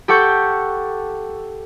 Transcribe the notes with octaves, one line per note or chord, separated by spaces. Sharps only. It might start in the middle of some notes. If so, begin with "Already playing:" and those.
G4 A4 F#5 C#6 G6